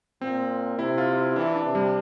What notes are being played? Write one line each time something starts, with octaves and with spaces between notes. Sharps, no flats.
A#2 C4
C3 E4
F4
E4
E3 D4
D4
C3
G3